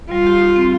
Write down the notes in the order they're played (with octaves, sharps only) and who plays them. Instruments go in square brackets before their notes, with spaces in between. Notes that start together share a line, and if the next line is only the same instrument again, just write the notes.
[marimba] G3 [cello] F4
[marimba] G4
D#4
C4